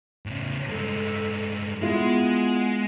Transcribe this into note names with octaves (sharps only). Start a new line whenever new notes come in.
A2 C#3
G2 G#3 A4
G#3 B3 E4 F4 G#4